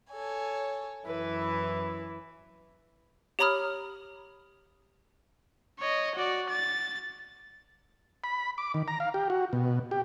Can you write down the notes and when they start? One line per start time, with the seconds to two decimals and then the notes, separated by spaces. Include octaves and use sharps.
0.12 A4 C#5 G#5
1.05 F#2 E3 E4 B4
3.39 G4 C#5 A#5 B5 D#6 F6
5.79 C#5 D#5
6.15 F#4 D5
6.50 A6
8.24 B5
8.58 D6
8.74 D#3
8.88 A#5
9.00 F5
9.14 G4
9.30 F#4
9.53 B2
9.91 G4